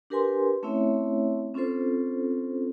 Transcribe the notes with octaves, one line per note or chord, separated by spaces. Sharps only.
D4 G4 A#4 B4 G#5 C6
A3 C4 C#4 E4 C#5 E5
C4 C#4 F4 A4 C5